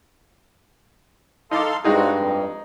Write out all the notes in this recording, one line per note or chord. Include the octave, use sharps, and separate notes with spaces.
D#4 A4 F5 C6 D6
G2 G#3 C4 D#4 F#4 G#4
F2